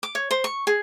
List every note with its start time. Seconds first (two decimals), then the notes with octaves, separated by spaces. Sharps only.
0.03 D6
0.15 C#5
0.31 C5
0.44 C#6
0.67 G#4